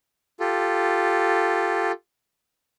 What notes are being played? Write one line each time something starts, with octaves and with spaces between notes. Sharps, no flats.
F4 G4 A4